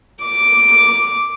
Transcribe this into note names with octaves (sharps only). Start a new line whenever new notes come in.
D6